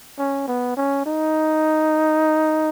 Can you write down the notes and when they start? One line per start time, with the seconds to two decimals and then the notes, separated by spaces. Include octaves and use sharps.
0.18 C#4
0.47 B3
0.77 C#4
1.06 D#4